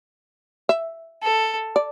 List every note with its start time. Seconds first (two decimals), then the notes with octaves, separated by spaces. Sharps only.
0.69 E5
1.23 A4
1.76 D5